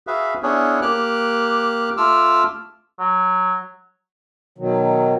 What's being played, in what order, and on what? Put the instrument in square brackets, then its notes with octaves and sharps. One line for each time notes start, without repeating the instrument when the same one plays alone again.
[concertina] F#4 G#4 B4 E5 F5
B3 C#4 D4 E4 G#4 C#5
A#3 G4 D6 F6 F#6
A3 F4 D6 E6 F6
[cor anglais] F#3
[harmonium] B2 D#3 F#3